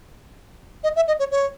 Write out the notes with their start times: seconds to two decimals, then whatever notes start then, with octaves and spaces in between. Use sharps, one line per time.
0.84 D#5
0.96 E5
1.08 D#5
1.19 C#5
1.31 C#5